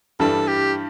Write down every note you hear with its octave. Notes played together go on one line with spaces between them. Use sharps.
G2 E3 G3 D4 A4
G4